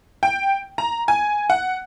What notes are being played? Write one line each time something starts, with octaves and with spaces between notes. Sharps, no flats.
G5
A#5
G#5
F#5